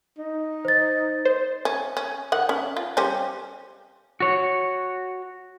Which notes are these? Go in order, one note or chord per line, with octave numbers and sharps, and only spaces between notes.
D#4
C5 A6
C5
C#4
C#4
D#3 F#5
C#4
F4
G3 C#4 C5
F#4 C#5